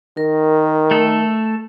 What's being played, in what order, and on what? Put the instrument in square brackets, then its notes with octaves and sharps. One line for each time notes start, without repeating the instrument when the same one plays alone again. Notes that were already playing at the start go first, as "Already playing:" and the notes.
[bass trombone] D#3 [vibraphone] A#4
[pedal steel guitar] A3 A4